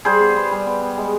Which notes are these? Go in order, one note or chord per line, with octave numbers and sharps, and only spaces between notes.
G3 G#4 C5
B3
B3
G3
B3
B3
G#3